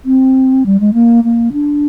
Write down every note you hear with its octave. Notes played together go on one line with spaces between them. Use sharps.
C4
G3
G#3
A#3
A#3
D4